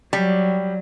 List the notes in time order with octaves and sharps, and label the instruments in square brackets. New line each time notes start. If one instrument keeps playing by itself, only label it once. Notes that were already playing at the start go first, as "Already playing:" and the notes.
[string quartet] F#3 [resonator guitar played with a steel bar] G3